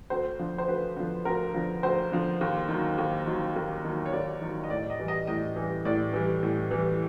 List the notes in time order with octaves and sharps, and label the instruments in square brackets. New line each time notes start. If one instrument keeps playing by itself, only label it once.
[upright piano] D2 C5
D3 F3
C5
D2 B4
D3 F3
D2 A#4
D3 F3
D2 C5
D3 F3
D#2
D#3 F#3
D#2
D#3 F#3
D#2
D#3 F#3
C#5
D#2 D5
D#3 F#3
D#5
A2 D5
D#5
E3 G3
D#5
A2 D#5
E3 G3
A2 D5
E3 G3
A2
E3 G3